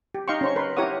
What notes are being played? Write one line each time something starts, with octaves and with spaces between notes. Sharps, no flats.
G4
D#4 D#5 F5 G5 C6 C#6
C#4 C5 C#6
A#4 B4 C6
E4 G4 A#4 C#5 F#5 D#6